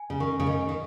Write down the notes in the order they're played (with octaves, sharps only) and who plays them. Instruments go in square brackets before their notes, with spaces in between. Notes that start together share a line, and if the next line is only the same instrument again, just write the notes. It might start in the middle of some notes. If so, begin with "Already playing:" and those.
Already playing: [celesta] G#5
[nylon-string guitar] C#3
[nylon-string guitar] D#3 [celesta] C#6
[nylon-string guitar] C#3
[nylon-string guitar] D#3 [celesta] D#5
[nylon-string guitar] D#3